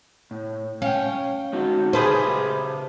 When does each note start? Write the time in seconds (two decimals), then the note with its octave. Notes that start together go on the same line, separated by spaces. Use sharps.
0.31 A2
0.82 C#4 F5 G5
1.53 G#3 D#4 F#4
1.93 C#3 G4 G#4 B4 C5 A5